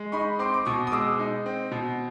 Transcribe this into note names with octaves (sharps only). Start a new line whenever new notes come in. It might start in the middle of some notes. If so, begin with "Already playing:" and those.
Already playing: G#3
D#4 B5 C#6
C4 C6 D6
D6
B2 C#6 D#6
D#6
G#3 D6 E6
D#4
C4
B2